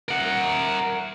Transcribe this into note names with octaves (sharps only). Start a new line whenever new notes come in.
A#4 F#5